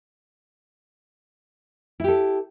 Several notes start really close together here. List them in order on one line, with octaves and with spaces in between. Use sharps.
E4 G4 A4